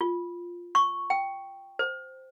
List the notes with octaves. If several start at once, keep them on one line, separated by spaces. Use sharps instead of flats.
F4
C#6
G5
C5